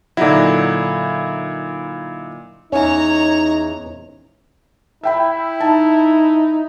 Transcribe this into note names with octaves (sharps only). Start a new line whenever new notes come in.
A#2 D3 F#3 D#4 E4
E2 C#4 D#4 C#5 A#5
E4 E5 G5 B5
D#4 A5